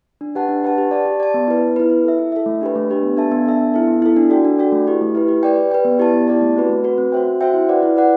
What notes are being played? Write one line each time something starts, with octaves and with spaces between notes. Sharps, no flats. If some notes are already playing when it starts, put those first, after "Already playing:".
D4
G4 B4 F#5 A5
D4
G4 B4 F#5 A5
G4
D5 A5
G4
D5 A5
B3
E4 B4
B3
E4 B4
E4
A4 E5
E4
A4 E5
A3
D4 G4 B4
A3
D4 G4 B4
B3
D4 A4 E5 A5
B3
D4 A4 E5 A5
B3
E4 A4
B3
E4 A4
D4
F#4 A4 D5 G5
D4
F#4 A4 D5 G5
A3
E4 G4 B4
A3
E4 G4 B4
G4
B4 D5 G5
G4
B4 D5 G5
B3
E4 G4 D5 A5
B3
E4 G4 D5 A5
A3
C4 F#4 B4
A3
C4 F#4 B4
C4
F#4 C5 E5 G5
C4
F#4 C5 E5 G5
E4
B4 D5 F#5
E4
B4 D5 F#5